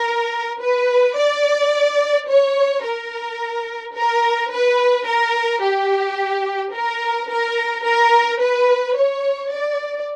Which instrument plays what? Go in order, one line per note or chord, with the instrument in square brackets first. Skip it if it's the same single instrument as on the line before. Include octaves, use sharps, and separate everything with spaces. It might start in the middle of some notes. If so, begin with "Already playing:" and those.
Already playing: [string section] A#4
B4
D5
C#5
A#4
A#4
B4
A#4
G4
A#4
A#4
A#4
B4
C#5
D5